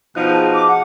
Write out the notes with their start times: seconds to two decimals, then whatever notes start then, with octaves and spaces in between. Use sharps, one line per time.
0.15 B2 F3 D#4 F#6
0.29 G#4 A5
0.54 D6
0.68 F#5